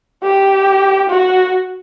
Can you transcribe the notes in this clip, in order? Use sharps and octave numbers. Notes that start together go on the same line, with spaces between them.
G4
F#4